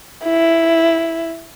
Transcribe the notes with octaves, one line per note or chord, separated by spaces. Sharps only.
E4